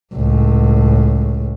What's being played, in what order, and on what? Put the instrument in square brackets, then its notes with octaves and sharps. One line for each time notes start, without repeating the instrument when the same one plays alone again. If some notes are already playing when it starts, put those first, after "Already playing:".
[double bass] C#2 A2